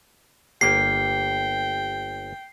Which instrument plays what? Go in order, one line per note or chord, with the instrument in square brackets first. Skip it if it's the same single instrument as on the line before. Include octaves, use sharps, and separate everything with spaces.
[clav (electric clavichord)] G1 A#3 G4 [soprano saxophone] G5 [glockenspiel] C7